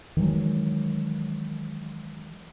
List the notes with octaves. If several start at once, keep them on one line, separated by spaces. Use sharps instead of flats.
D#3 E3 F#3 G#3